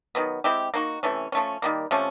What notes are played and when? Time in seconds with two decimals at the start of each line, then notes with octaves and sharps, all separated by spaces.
0.15 D#3 F#3 B3
0.44 G#3 C4 E4 G4
0.74 A#3 D#4 F#4
1.03 C3 E3 A3 C#4
1.32 F3 A3 C#4
1.62 D#3 G3 A#3
1.91 C3 F3 A3 C#4